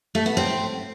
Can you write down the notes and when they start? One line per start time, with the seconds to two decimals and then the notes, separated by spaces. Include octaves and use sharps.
0.15 A3
0.26 B3
0.37 C4